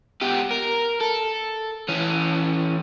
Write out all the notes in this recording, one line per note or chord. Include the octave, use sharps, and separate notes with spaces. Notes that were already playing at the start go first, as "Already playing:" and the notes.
B3 G4
A#4
A4
E3 C#4